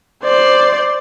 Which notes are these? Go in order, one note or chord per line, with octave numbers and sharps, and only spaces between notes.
C5 D5